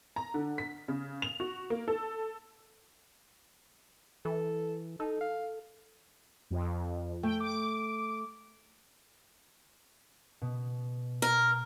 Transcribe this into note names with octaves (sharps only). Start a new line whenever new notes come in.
A#5
D3
B6
C#3
F7
F#4
A#3
A4
E3 A4
D#4 A4
F5
F2
A3 G5
D6
B2
A#4